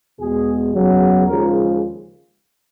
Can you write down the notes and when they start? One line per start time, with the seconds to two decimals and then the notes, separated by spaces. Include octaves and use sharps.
0.19 E2 B2 G#3 G#4
0.73 E2 C#3 F#3
1.27 D#2 C#3 F3 G#3 A#4